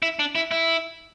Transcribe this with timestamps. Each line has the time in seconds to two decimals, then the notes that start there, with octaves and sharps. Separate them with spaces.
0.02 E4
0.19 D4
0.35 E4
0.51 E4